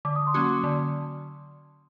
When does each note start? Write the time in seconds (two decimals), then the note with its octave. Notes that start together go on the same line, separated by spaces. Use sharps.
0.05 D3 D6
0.16 D#6
0.27 C6 D6
0.34 F#3 A#3 C#4 F#4
0.64 D3